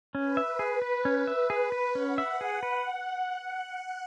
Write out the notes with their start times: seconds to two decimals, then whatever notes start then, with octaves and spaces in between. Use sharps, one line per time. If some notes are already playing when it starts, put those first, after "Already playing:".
0.14 C#4 B4
0.37 E5
0.59 G#4
0.82 B4
1.05 C#4
1.27 E5
1.50 G#4
1.72 B4
1.95 C#4 F#5
2.18 E5
2.41 G#4
2.63 B4